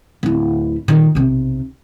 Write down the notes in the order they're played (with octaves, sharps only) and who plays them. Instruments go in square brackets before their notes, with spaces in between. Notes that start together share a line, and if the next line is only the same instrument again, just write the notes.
[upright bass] D1 E4
A#2 D#3
B1 C3